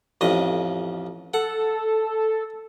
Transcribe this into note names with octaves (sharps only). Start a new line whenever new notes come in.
A1 F2 D#5
A4 F#5